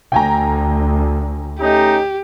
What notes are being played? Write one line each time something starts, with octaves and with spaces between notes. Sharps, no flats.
D2 G5 G#5 A#5
A3 C#4 D#4 G4